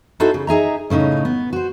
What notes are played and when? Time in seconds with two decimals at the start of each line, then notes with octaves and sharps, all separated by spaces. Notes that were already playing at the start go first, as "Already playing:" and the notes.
0.20 D#4 E4 F#4 A4 C5
0.34 C#3
0.47 D#4 G#4 E5 A#5
0.90 A2 C#3 C#4 D#4
1.25 B3
1.53 F#4 C5